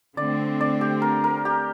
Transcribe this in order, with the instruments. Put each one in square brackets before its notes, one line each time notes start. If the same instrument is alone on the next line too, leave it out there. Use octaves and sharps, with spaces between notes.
[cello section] D3 A3 C4 [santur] D5
[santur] D5
G4
A#4
A#4
G4